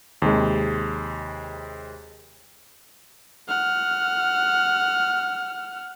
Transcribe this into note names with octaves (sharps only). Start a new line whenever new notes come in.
D#2 C3 G#3
F#5 F6